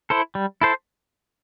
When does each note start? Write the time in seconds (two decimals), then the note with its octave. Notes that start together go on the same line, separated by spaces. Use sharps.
0.10 E4 A4 C5
0.35 G3
0.61 E4 A4 C5